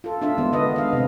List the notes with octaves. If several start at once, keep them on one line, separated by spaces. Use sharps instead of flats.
F4 A4
D4 F4 E5
D#3 G#3 B3
D3 B4 D#5
D#5 F5
C3 C4